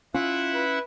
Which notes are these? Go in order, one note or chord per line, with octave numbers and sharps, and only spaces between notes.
C#4 E4 F4 E5 F#5
B4